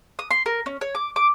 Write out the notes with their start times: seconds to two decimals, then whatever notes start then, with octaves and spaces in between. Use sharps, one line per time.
0.19 D#6
0.31 C6
0.46 A#4
0.66 C#4
0.81 C#5
0.95 D6
1.16 D6